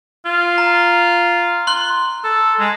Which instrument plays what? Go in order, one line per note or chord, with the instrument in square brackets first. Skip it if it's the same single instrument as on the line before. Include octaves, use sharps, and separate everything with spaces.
[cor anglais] F4
[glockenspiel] A#5
C6 F#6 G7
[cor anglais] A4
G#3